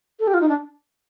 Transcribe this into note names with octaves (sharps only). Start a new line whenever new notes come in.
A4
G4
F4
D#4
D4